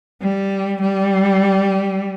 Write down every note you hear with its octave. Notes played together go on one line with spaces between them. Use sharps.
G3
G3